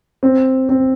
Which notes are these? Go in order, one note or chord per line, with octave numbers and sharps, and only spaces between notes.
C4
C4